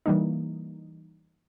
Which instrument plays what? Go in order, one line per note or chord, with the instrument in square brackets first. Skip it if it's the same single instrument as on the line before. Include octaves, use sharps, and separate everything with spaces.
[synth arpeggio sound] E3 G3 A#3 D#4